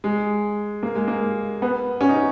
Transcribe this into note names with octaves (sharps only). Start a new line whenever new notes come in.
G#3
A#3
G#3
A#3
B3
C#4
D#4
C#4